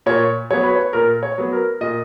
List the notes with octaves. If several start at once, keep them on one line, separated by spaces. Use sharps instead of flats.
A#2 C#5
F#3 B3 C#5
B4
C#5
A#2 A#4
C#5
F#3 B3
A#4
A#2 D#5